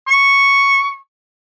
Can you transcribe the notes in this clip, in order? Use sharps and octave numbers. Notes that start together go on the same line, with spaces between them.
C#6